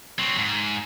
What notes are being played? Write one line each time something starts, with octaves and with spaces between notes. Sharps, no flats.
F#3 C4
G#2